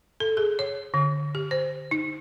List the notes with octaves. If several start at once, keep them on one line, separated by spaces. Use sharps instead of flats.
A4
G#4
C#5
D3
G4
C5
D#4